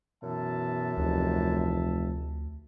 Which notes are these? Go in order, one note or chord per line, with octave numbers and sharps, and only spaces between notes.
F#2 B2 E3 E5 A5
F1 D2